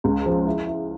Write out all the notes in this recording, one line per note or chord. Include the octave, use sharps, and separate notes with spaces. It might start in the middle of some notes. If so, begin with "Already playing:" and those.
C#2
F3
E4
E4